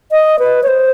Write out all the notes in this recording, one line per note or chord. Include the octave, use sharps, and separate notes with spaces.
D#5
B4
C#5
C5